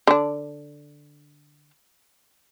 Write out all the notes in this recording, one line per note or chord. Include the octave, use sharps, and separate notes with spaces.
D3 D4